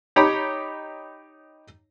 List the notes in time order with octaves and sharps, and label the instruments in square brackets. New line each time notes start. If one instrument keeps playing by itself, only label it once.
[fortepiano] D#4 G4 C#5 G5 A#5 B5